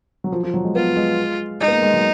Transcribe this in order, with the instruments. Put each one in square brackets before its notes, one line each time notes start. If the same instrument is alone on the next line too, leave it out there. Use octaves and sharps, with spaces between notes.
[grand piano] F#3
F3
F3
F#3
G#3
[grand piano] B3 [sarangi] F4
[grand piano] G#3
[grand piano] G#3 [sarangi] D#4
[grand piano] B3
A#3
G#3
F#3